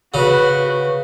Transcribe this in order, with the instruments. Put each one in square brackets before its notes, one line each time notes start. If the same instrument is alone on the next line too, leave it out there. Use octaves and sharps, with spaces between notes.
[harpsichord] C#3 [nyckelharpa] F#4 B4